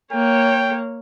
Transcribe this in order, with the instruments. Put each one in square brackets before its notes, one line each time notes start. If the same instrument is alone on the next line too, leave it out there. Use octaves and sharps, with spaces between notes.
[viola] A#3 C#5 [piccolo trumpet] G5